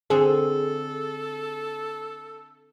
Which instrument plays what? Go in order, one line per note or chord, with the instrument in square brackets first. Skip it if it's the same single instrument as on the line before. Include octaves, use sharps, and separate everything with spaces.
[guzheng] D3 C4 [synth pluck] G#4 [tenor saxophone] A4